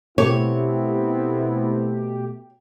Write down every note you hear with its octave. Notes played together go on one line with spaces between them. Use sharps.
B2 A3 B3 C4 E4 G4 C#5